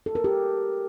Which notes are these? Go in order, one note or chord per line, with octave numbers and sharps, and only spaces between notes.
A4
A#4
G4